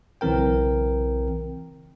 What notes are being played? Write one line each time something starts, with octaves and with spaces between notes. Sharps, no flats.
B1 C#3 E3 C4 A#4 G5